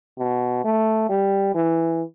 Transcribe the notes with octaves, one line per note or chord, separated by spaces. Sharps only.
B2
A3
G3
E3